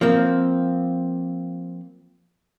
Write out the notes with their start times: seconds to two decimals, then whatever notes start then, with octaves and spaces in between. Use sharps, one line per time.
0.01 F3 A#3 C4